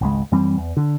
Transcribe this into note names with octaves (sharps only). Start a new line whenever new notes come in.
G#1 C#2 G#3
F#2 E3 G3 C4
E2
D3